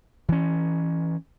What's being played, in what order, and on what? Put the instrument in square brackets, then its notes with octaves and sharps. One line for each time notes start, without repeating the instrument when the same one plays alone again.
[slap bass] E3 C#4